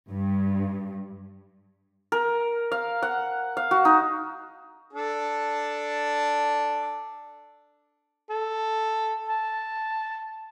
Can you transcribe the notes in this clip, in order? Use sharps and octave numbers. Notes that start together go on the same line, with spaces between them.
G2
A#4
F5
F#5
F5
F#4
D#4
D4 A4 A5
A4
A5